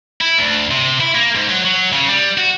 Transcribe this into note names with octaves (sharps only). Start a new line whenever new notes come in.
E4
D2
C3
E4
A#3
G#2
F#3
F#3
C#3
G3
F#4